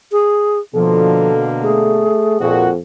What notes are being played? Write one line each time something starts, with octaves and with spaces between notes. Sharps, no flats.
G#4
B2 D3 F3 A#3 A4
A3 G#4
F2 A#2 F#4